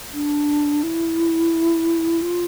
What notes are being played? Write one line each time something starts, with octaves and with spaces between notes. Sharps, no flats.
D4
E4
F4